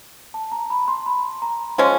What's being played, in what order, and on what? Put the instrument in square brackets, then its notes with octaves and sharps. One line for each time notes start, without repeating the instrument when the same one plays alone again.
[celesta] A5
A#5
B5
C6
B5
A#5
[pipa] F3 G#3 C#4 [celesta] C6